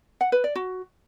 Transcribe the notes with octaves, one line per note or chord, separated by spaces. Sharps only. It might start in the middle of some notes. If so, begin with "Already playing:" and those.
F#5
B4
D5
F#4